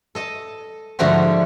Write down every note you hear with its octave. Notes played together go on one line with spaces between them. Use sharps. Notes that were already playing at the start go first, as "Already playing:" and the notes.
A4 D#5 A5
G#2 D3 F3 A3 F#4 G4